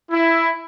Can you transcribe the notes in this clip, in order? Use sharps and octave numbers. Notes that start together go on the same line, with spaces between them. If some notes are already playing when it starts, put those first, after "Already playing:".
E4